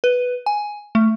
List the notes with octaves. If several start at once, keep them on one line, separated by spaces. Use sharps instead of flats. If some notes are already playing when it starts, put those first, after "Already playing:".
B4
G#5
A3